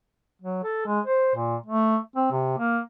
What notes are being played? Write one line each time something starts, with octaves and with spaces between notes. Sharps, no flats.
F#3
A4
G#3
C5
A#2
A3
C4
C3
A#3